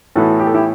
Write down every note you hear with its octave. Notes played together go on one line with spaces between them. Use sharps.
A2 E3 B3 F#4 A4
G4
A4
E4 G4